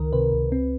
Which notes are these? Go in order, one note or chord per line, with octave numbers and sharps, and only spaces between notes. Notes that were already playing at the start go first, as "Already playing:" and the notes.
Already playing: C#2 D#3 A#4
C3 B4
C#2
C4